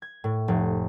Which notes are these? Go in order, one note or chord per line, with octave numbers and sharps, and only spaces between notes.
G#6
A2
F1